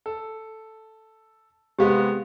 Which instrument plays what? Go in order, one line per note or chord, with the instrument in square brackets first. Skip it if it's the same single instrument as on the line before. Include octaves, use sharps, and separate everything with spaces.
[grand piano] A4
[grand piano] C3 G#3 B3 [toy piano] G4 F5